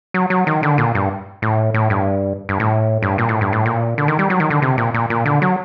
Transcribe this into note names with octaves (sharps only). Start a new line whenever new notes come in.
F#3
F#3
D#3
D3
A#2
G2
A2
A2
G2
G2
A2
G2
A#2
A2
G2
A2
A#2
D3
D#3
G3
F#3
D#3
D3
C3
A#2
A#2
A#2
D3
F#3